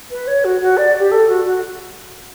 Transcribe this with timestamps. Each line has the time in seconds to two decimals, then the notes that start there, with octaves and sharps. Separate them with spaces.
0.11 B4
0.27 C#5
0.44 F#4
0.61 F#4
0.77 D5
0.99 G4
1.11 A4
1.28 F#4
1.45 F#4